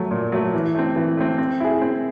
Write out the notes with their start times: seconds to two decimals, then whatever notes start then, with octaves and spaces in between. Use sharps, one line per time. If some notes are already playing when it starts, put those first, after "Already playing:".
Already playing: F#3 A3
0.11 A#2
0.32 F#3 A3
0.54 E3
0.75 A3 C4
0.96 E3
1.17 A3 C4
1.38 C4
1.60 E4 G#4
1.82 C4